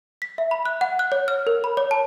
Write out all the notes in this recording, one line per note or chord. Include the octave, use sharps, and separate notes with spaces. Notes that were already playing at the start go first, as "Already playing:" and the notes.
B6
E5
B5
F#6
F#5
F#6
C#5
F6
A#4
B5
C#5
A5